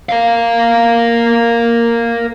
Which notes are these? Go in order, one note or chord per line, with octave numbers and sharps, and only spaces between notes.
A#4 F5